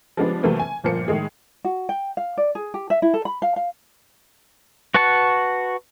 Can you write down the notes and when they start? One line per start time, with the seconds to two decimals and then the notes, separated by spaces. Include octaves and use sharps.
0.17 F3 G3 G#3 B3 D4
0.43 C3 E3 F#3 A3 A#3 C4
0.59 G#5
0.84 G1 A#2 F3 A#3 C5 C#7
1.08 A2 D#3 G#3 G#4
1.65 F#4
1.89 G5
2.17 F5
2.37 D5
2.55 G#4
2.74 G4
2.90 E5
3.02 E4
3.14 A4
3.25 B5
3.42 F5
3.56 F5
4.94 F#4 B4 F#5 A5 C#6